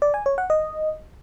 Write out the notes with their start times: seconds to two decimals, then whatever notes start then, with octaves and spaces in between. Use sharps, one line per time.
0.02 D5
0.14 G#5
0.26 C#5
0.38 F#5
0.50 D#5